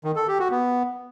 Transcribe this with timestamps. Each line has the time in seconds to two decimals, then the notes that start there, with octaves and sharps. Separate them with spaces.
0.04 D#3
0.16 A4
0.28 G4
0.40 F#4
0.51 B3